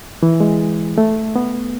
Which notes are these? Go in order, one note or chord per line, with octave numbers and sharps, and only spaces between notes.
E3
G#3
A3
B3